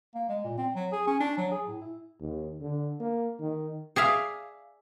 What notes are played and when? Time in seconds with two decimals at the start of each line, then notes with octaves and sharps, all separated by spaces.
0.15 A#3
0.29 G#3
0.44 A#2
0.58 C4
0.74 F#3
0.92 G#4
1.07 C#4
1.20 D4
1.37 F#3
1.51 G#4
1.67 A2
1.81 E4
2.20 D#2
2.61 D3
3.00 A#3
3.40 D#3
3.96 G#4 D5 E5 F5